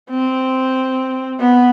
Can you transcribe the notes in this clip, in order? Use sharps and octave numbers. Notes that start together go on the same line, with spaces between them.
C4
B3